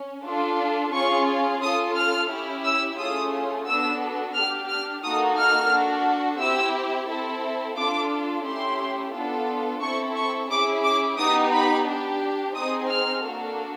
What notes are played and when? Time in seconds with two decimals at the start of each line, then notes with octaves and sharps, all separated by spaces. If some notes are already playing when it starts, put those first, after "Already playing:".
Already playing: C#4
0.25 D4 F4 A4
0.93 C#4 F4 G#4 C#6
1.61 C#4 F4 A4 D#6
1.95 F6
2.30 C#4 E4 G4
2.65 E6
2.98 A3 C#4 F4 G#4 D#6
3.67 B3 D4 F#4 A4 E6
4.35 D4 G4 F6
4.69 F6
5.03 A#3 D#4 F#4 A4 D#6
5.38 F6
5.71 D4 F#4 A4
6.40 C4 E4 G4 E6
7.09 C4 E4 A4
7.76 D4 F4 A4 D6
8.45 A3 C#4 E4 G4 C6
9.13 B3 D4 F4 A4
9.81 C4 E4 A4 C#6
10.15 C#6
10.50 C#4 E4 G#4 D6
10.84 D6
11.18 B3 D#4 G4 D#6
11.52 B5
11.86 D4 G4
12.54 C4 D#4 G#4 D#6
12.88 F6
13.22 A#3 D4 F#4 A4